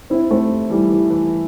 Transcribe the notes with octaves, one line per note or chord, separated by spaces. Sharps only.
C4 E4
A3 C4
E3 G3
E3
E3